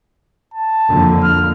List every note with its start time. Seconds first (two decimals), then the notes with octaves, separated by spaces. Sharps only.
0.54 A5
0.90 F2 D3 A#3
1.23 F6